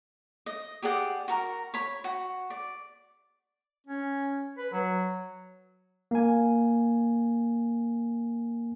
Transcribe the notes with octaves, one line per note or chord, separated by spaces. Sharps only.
D#5
G4 G#4 D5 F#5
F#4 A#4 A#5
C#5 B5
F#4
D5
C#4
B4
F#3
A#3 G#5